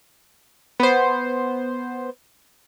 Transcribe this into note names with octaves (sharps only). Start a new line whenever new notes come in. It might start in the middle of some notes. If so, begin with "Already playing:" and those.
B3 C5